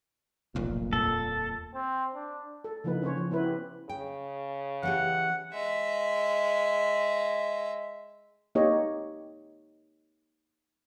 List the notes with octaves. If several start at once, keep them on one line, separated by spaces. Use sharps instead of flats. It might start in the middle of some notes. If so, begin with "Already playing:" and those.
F1 B1 F2 A#2
D#1 F2 A#3 A4
C4
D4
A4
C#3 E3 F3 A#3 D#4 B4
C#3 C#4 C5 C#5
F3
B3 C#4 E4 B4 C5
G4
C#3 G5
E3 C#4 G4 F#5
G#3 E5
A#3 D#4 G4 C#5 D#5